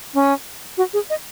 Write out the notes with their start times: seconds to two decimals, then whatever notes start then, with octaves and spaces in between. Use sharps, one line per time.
0.14 C#4
0.77 F#4
0.93 G#4
1.10 D#5